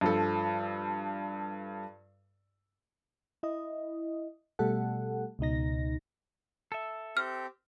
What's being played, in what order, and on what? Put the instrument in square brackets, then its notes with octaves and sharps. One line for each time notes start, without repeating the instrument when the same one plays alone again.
[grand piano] G2 F3 A4
[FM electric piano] E4 D#5
B2 G3 A3 A4 F#5
C#2 B2 D#4 A#6
[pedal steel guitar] A4 E5
[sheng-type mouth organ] C4 G4 [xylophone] F6